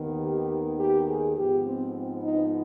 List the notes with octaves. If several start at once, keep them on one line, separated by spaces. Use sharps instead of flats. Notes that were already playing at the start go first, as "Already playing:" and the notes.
Already playing: D#2 D#3 B3
G4
G4
G#4
G#2 F3 B3 G4
C4
C4
D#4